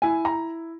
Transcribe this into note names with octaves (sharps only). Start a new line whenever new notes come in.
E4 G#5
A#5